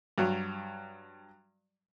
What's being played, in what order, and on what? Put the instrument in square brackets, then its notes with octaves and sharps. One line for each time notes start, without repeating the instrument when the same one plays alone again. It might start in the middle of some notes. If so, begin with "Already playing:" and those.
[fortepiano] G2 F#3